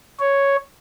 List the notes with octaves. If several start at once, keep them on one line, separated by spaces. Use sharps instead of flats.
C#5